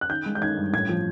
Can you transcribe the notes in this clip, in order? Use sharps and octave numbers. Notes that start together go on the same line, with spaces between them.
F#6
D#3 G6
G#3
G6
D#3 G#6
G2
A2 G#6
F3